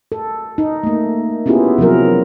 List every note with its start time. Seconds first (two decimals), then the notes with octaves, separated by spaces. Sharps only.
0.12 A4
0.58 D#4
0.83 A3 A#3
1.46 B3 C#4 E4 F4 G4 G#4
1.78 C3 F3 F#3 A#4